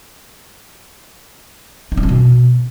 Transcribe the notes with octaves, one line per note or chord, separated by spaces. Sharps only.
D#4
D4
C#4
B2